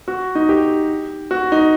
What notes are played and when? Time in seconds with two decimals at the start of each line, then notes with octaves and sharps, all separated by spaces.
0.08 F#4
0.35 D#4
0.49 G4
1.31 F#4
1.52 D#4